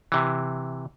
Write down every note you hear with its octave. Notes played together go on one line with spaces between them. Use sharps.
C3 E3